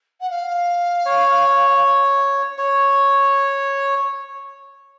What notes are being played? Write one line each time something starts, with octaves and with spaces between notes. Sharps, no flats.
F#5
F5
C#5
C#5